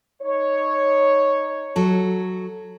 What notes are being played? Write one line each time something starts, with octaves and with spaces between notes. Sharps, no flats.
D#4 C#5
F#3 A4